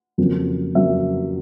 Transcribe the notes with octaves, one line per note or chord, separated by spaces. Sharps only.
F2 C#3 F#3 A#3
F2 C#3 F#3 A#3 E5